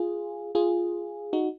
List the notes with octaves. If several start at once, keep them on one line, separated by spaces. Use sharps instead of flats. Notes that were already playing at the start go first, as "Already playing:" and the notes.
Already playing: F4 G#4
F4 G#4
D#4 F#4